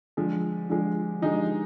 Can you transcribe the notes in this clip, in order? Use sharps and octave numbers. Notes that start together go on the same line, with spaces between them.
D3 F3 G#3
D3 F3 G#3
D3 F3 G#3 D#4